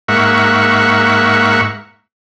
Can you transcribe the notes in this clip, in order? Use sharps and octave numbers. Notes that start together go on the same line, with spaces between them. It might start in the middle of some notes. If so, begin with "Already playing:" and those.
G#2 A#3 E5 F#5 C#6